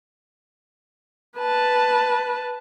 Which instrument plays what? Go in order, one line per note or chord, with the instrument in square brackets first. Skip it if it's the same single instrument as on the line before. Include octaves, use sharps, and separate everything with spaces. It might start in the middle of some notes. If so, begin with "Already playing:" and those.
[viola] B4 A5